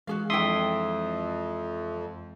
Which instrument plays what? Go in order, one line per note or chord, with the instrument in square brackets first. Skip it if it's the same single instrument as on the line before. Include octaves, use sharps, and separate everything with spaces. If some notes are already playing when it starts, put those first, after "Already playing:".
[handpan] E3 G#3 [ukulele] F#4 G#4 F5
[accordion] F2 [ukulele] D4 E4 G5 [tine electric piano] E5 C6 D#6